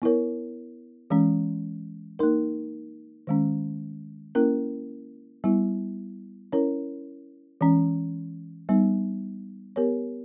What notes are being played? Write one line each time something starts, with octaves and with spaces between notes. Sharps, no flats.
B3 E4 A#4 C#5
E3 G#3 C#4
A#3 D#4 A#4
D#3 G#3 C#4
A#3 C#4 E4 A#4
G3 B3 E4
C#4 E4 A#4 C#5
E3 G#3 C#4
G3 B3 D#4
B3 G4 A#4 C#5